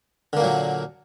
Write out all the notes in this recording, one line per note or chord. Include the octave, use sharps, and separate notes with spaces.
A#2 D3 F#3 A#3